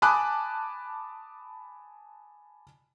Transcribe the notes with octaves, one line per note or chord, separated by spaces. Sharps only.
G#5 A5 B5 D6 D#6 F#6